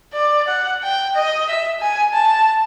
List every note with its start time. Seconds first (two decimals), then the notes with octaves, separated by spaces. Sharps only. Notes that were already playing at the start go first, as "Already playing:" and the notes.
0.14 D5
0.48 F#5
0.83 G5
1.15 D#5
1.49 E5
1.80 G#5
2.13 A5